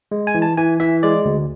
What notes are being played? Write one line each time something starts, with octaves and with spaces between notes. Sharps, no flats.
G#3
G#5
E3
A5
E3 G#5
E3 E5
G#3 D5
D2